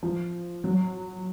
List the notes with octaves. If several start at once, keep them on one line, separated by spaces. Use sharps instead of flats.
F3
F#3